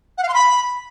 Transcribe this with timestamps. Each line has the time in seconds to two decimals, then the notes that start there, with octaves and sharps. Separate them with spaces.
0.17 F#5
0.23 F5
0.28 C6
0.34 B5